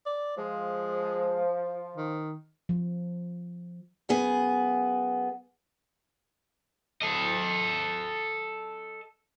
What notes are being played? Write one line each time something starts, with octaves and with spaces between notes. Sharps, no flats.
D5
F3 G#3
D#3
F3
F#2 B3 G#4
A4 D#5